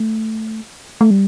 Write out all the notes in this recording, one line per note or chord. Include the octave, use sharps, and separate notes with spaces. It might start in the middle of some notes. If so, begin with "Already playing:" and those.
Already playing: A3
A3
G3